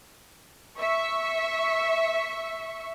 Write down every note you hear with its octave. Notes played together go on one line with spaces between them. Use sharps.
E5 C#6